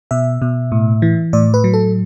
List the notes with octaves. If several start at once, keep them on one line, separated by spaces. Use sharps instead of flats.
B2 E5
B2
A2
E3
A2 D5
B4
F#3
A4